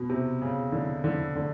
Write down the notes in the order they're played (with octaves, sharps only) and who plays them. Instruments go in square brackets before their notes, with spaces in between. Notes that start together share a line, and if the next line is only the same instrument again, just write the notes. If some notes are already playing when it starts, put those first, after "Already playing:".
Already playing: [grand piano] B2
C3
C#3
D3
D3
D3